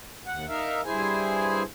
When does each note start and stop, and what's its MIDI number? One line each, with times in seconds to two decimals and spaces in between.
0.27 0.46 39
0.27 0.46 78
0.48 0.81 63
0.48 0.81 70
0.48 0.81 76
0.48 0.81 77
0.85 1.63 43
0.85 1.63 64
0.85 1.63 68
0.85 1.63 72
0.85 1.63 80